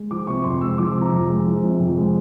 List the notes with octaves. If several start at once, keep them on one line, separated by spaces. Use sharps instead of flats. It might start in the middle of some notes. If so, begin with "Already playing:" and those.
Already playing: G#3
F3 D6
C3 C#6
F2 C6
G#3 E6
F3 D6
C3
A#5
F2
G#3
F3
C3
F2
G#3